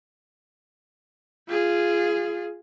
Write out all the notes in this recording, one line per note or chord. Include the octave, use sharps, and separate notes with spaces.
F4 G#4